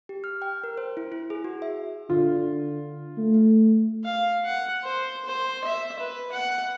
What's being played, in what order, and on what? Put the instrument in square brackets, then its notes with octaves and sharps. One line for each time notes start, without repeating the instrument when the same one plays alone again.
[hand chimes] G4
F6
G5
A#4
C5
E4
E4
G#4
F#4
E5
[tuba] D3 [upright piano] F4
[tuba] A3
[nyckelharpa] F5
F#5
C5
C5
E5
B4
F#5